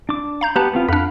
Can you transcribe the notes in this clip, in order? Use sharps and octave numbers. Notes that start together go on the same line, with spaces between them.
D4 D6
F5 A#5 G6
B3 G4 B4 F#5 A5 A#5
B3 C4 F4
F2 D4 F5 F#5 B5